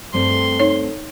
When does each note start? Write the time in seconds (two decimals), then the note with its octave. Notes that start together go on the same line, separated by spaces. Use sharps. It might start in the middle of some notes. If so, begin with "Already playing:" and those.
0.14 G2 A3 C4 C6
0.59 D#4 C#5